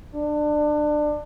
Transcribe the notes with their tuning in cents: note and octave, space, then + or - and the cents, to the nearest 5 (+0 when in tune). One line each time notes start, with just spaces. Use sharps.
D4 +25